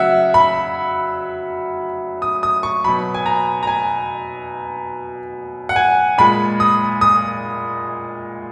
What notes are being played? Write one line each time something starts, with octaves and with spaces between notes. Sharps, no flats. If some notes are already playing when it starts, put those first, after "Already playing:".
Already playing: C#3 F#3 E5 F#5
B5
D#6
D#6
C#6
B2 F#3 B5
G#5
A#5
A#5
G#5
F#5
G#5
A#2 G#3 B5
D#6
D#6